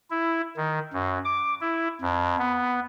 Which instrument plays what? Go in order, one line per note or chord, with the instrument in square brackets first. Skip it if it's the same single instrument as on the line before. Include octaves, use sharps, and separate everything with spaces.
[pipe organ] E4
D#3
F#2
D6
E4
F2
B3